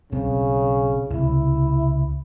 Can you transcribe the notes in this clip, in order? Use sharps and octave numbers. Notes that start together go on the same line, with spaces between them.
B1 C#3 C4
C#2 C3 E4